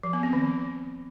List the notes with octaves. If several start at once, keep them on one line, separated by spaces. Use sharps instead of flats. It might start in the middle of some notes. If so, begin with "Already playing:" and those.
F3
B3
C4
D#3